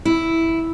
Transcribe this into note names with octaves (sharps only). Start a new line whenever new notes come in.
E4